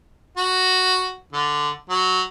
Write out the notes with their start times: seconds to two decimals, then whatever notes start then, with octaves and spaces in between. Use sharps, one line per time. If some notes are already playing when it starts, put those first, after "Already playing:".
0.37 F#4
1.33 D3
1.90 F#3